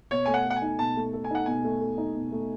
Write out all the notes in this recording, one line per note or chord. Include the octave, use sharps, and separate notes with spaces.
B2 C#5
A3 G#5
F#5
A4
F#5
G#5
D#4
B2 A5
A3
A4
G#5
D#4 F#5
B2 G#5
A3
A4
D#4
B2
A3